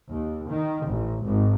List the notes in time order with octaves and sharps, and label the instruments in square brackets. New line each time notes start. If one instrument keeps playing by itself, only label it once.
[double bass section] D#2
D#3
A1
G#1